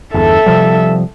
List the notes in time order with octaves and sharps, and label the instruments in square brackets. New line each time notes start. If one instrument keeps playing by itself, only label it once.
[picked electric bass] G1 E2 [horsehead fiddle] A4 E5
[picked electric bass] C3 F3 G3